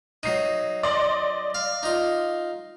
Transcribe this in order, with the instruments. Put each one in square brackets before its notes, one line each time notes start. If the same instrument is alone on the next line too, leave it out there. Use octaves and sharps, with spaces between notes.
[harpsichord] F#3 D#4 [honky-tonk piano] C7 D#7
[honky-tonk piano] D5 D#5 C6
[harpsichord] F5
D#4 F4